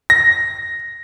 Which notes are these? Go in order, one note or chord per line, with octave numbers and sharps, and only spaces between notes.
A#6